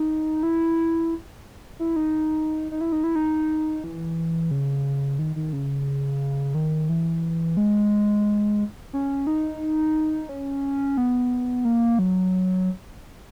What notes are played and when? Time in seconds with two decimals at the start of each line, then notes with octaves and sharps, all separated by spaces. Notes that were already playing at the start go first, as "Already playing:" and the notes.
Already playing: D#4
0.43 E4
1.79 E4
1.96 D#4
2.72 D#4
2.81 E4
2.92 D#4
3.04 E4
3.16 D#4
3.84 E3
4.51 C#3
5.19 D#3
5.36 D#3
5.53 C#3
6.55 D#3
6.89 E3
7.57 G#3
8.93 C#4
9.27 D#4
10.29 C#4
10.97 B3
11.65 A#3
11.99 F#3